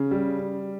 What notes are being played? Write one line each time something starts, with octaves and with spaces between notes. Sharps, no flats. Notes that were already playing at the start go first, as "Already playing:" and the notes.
Already playing: C#3
G3